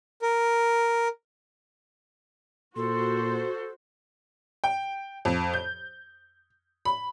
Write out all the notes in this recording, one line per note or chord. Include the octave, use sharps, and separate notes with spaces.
A#4
A#2 F#4 A4 C5 C6
G5
F2
G6
B5